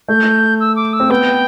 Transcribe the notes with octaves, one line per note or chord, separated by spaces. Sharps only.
A3 G6
E6
D6
E6
C4
B3 G5